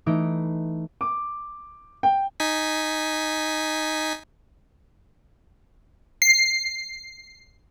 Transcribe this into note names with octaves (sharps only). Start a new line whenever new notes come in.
E3 A3 D#4 D7
D6
G5
D#4 G#5 B6
C7